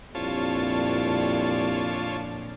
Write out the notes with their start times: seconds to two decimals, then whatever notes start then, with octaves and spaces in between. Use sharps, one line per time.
0.15 C2 F2 A#2 D4 F4 C#5 A5